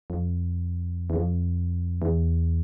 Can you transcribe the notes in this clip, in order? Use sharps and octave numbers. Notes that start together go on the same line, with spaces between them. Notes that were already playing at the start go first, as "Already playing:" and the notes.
F2
E2
F2
E2